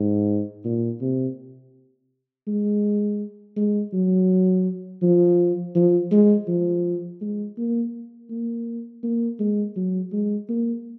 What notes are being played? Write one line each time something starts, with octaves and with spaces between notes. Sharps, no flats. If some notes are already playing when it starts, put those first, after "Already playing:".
Already playing: G#2
A#2
C3
G#3
G#3
F#3
F3
F3
G#3
F3
G#3
A#3
A#3
A#3
G#3
F#3
G#3
A#3